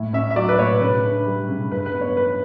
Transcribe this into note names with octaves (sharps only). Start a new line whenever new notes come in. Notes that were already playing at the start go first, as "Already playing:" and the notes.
Already playing: A2
C#4 E5
E5
F#3 D5
B4
A2 C#5
C#3 B4
D4
G3
C#3
G2 B4
B4
B3
C#5
E3 B4